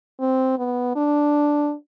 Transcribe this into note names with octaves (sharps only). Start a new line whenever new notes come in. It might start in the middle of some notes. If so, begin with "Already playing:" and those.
C4
B3
D4